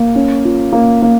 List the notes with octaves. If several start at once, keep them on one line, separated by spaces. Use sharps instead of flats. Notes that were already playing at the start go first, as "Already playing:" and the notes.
Already playing: A#3
C#4
F4
A#3
A#3